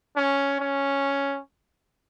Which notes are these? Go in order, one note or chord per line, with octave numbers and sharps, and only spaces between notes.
C#4
C#4